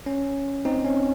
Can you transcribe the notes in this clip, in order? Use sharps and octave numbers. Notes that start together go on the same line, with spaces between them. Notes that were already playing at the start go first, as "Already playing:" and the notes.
C#4
C4 D#4
C#4